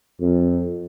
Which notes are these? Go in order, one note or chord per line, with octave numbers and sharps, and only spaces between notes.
F2